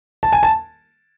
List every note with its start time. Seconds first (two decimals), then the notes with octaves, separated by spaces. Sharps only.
0.23 A5
0.32 G#5
0.43 A5